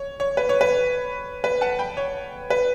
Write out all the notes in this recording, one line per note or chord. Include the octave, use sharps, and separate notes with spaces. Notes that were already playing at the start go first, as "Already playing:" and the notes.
Already playing: C#5
C#5
B4
C#5
B4
B4
F#5 A5
G5 B5
C#5
B4